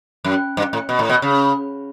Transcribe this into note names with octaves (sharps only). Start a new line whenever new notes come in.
F#2
G2
A2
B2
A2
B2
C#3